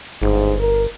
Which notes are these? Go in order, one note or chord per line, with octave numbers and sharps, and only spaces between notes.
G1 G#2
A#4